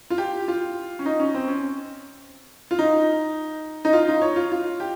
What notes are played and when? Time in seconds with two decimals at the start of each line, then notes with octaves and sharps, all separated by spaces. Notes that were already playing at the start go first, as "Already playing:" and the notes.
0.10 F4
0.18 G4
0.48 F4
0.99 C#4
1.06 D#4
1.20 C#4
1.34 C4
1.48 C#4
2.71 F4
2.79 D#4
3.85 D#4
3.93 F4
4.08 D#4
4.22 C#5
4.36 F4
4.52 F4
4.80 G4